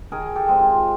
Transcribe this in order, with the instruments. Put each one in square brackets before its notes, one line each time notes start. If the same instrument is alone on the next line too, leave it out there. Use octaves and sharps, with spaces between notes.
[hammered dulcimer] D#3 G#4 A#4
G4 A4
G#3 C4
F4